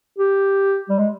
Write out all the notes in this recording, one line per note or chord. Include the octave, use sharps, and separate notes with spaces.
G4
G3
G#3